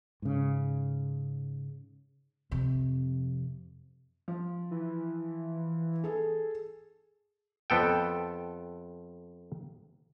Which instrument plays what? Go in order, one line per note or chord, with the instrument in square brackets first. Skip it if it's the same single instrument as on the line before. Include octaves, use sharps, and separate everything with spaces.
[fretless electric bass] G#2 C#3
[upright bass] F2 C3
[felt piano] F3
[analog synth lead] E3
[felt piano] G#4 A4
[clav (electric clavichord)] F2 B3 A4 G5